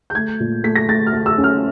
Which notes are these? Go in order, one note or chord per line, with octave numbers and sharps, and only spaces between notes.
G6
A3 G#6
A#2
A3 B6
A#6
A3 A6
F6
A3
E6
C#4
F6